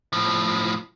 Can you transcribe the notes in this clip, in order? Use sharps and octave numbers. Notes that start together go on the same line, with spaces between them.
A2 F3